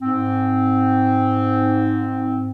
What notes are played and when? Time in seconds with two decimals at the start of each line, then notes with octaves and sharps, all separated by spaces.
0.01 G#2 C4